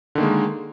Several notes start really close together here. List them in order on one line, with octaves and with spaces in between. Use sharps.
D3 D#3 A#3 G#3